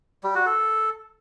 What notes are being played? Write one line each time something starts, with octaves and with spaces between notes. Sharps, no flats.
G3
F#4
A4